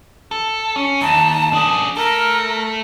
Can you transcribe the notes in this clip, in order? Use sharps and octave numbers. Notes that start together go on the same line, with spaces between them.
A4
C#4
D#2 A5
D4 G#4
A3 A4 A#4